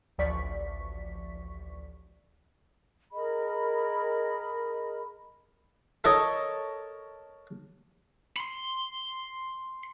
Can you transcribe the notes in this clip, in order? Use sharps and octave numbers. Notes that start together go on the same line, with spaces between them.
A1 D2 F3 D5 C#6 B6
G#4 A#4 D#5 B5
A4 A#4 C#5 D#5
B5 C6